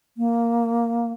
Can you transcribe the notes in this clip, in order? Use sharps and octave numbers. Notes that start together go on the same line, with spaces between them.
A#3